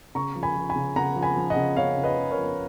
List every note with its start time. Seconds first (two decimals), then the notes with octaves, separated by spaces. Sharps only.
0.15 C#3 A#5 C#6
0.36 F3
0.43 G#5 B5
0.56 F3
0.70 G#5 B5
0.76 C#3
0.96 C#3 F#5 A#5
1.16 F3
1.23 G#5 B5
1.37 F3
1.50 D#5 F#5
1.56 C#3
1.77 C#3 C#5 F5
1.97 C#3
2.03 B4 D#5
2.17 C#3
2.31 A#4 C#5
2.37 F3